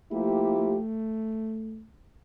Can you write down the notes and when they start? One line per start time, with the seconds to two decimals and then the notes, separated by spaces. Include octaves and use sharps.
0.12 F3 A3 A#3 E4 G4
0.58 A3